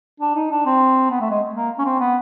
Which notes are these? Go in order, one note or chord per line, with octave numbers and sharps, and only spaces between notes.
D4
D#4
D4
C4
B3
A3
G#3
A#3
C#4
C4
B3